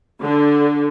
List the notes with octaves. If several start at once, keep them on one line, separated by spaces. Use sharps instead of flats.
D3